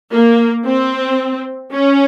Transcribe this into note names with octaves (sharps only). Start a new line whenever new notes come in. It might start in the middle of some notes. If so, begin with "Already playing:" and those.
A#3
C4
C#4